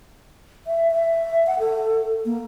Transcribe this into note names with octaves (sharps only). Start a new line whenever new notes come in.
E5
E5
F#5
A4
A#3